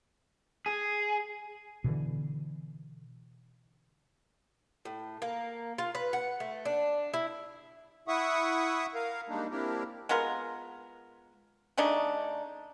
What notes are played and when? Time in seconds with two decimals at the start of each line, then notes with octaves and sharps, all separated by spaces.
0.66 G#4
1.84 B2 D3 E3
4.85 A2
5.22 A#3
5.78 F4
5.95 B4
6.13 F#5
6.40 A3
6.65 D4
7.14 E4
8.08 E4 E5 F#5 C#6 D#6
8.95 A#4 F5
9.29 G3 G#3 A#3 D4 D#4
9.50 A#3 C4 D4 E4 G4 A#4
10.09 G#3 B3 F4 A#4
11.77 C#3 A3 D4 D#4